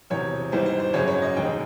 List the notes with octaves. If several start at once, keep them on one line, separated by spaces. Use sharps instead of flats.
E1 E2 C3 C#5
G#1 G#2 E3 G3 C5
C5
C5
G#1 F#2 C#3 F#3 C#5
C#5
D#5
F1 D#2 D#3 G#3 G5